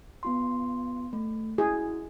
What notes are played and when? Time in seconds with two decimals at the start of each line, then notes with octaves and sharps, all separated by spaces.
0.23 B3 F4 C6
1.13 A3
1.58 E4 F#4 G#4